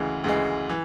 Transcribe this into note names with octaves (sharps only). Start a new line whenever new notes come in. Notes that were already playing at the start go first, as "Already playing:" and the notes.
Already playing: D2 C#3 E3 G#3
D2 C#3 E3 G#3
E3